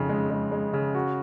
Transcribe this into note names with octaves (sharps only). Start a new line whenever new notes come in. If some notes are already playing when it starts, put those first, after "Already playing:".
Already playing: F2 C#3 D#4
G#3
G#3
G#3
C#3
F#4